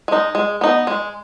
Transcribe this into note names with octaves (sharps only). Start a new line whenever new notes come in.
G#3 D#4
G#3
B3 D#4
G#3